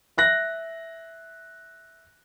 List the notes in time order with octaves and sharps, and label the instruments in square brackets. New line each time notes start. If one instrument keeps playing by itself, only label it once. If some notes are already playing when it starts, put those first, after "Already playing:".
[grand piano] E5 F#6 A#6